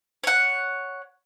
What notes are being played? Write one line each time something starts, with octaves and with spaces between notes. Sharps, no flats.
C#5 F#5